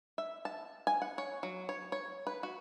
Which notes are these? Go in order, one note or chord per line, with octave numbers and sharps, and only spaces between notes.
E5
A5
G#5
F#5
C#5
F#3
C#5
C#5
B4
F#4